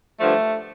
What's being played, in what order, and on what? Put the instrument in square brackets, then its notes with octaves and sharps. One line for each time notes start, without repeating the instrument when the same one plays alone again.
[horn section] G2 D3 F3 A3